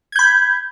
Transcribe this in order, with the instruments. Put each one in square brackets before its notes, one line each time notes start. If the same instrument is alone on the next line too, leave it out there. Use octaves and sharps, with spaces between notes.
[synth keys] G#6
G6
B5